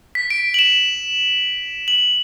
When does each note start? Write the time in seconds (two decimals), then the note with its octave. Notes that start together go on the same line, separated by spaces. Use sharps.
0.15 B6
0.30 D7
0.54 F#7
0.59 E7
1.88 F#7